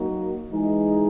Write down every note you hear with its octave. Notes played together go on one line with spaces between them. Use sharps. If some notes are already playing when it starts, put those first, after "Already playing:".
Already playing: F#3 A#3 D#4 F#4
E3 G#3 D#4 G#4